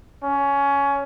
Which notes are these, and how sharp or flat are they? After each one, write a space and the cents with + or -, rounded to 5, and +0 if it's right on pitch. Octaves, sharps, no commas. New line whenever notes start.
C#4 +15